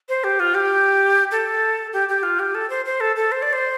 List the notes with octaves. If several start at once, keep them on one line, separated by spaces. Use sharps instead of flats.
C5
G4
F4
G4
A4
G4
G4
F4
G4
A4
C5
C5
A4
A4
C5
D5
C5